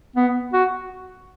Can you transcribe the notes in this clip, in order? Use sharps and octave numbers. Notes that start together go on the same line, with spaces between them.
B3
F#4